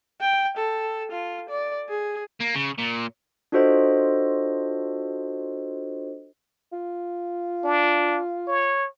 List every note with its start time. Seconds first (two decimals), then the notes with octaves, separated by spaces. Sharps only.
0.20 G5
0.57 A4
1.11 F4
1.49 D5
1.89 G#4
2.40 A#3
2.55 C#3
2.78 A#2
3.52 D4 F4 F#4 A4 C5 D#5
6.73 F4
7.64 D4
8.47 C#5